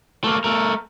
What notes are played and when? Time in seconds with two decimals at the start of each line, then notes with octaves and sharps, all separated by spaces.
0.24 A3 A#3
0.44 A3 A#4